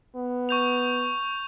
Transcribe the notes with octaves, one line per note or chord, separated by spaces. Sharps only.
B3
C#6 G6 F7